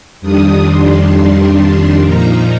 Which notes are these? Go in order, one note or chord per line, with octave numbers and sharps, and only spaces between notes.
F2 D#3 G3 D4 D#6
C6
C6
A#2 F3 A#3 D#4 A#5